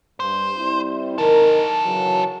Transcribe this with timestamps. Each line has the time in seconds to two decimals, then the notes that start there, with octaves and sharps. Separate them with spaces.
0.20 G2 C5
0.57 G3 C4 E4
1.18 D#3 D#4 A4 A#4
1.85 C#3 E3 F#3